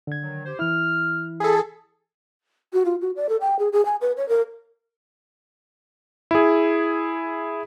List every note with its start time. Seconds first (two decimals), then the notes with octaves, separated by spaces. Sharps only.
0.07 D3 G#6
0.20 D#3 F#3
0.45 G4 C5
0.59 E3 E4 F6
1.40 G#4 A4 E5 B5
2.73 F#4
2.85 F4
3.01 F#4
3.16 D5
3.29 A4
3.41 G5
3.59 G#4
3.72 G#4
3.85 G#5
4.01 B4
4.17 C#5
4.29 A#4
6.31 E4 G#4